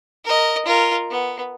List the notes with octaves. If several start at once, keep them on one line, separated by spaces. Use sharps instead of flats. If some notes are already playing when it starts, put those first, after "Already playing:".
A#4 D#5
F4 A#4
B3